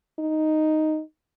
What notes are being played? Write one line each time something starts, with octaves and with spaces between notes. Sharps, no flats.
D#4